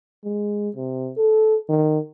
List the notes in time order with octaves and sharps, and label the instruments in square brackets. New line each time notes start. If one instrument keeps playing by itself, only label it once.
[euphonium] G#3
C3
A4
D#3